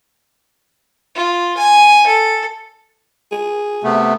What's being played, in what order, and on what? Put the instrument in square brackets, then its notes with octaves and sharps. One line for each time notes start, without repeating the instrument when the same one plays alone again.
[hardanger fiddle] F4
G#5
A4
[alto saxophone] G#4
[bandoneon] C3 A3 B3